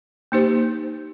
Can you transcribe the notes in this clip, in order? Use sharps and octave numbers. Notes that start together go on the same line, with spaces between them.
A#3 D#4 G4 C5